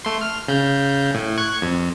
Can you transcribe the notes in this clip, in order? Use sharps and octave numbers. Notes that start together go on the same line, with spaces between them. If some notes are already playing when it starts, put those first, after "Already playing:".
A3 C6
F6
C#3 G6
A2
C#6 F#6 G#6
F2